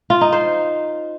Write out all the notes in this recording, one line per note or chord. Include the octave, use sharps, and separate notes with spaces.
F4
D#4
C5